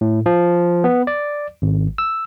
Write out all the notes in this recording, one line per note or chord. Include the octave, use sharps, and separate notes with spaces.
A2
F3
B3
D5
G#1
E6